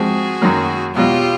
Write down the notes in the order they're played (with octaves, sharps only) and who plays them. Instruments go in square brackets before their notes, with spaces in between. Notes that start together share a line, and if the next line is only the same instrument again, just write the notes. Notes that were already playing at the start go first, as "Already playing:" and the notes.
Already playing: [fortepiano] G#2 F3 G#3 C4 [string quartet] F#4 G#4
[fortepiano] F#2 D#3 F#3 A#3
[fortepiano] E2 B2 F#3 [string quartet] F4 G4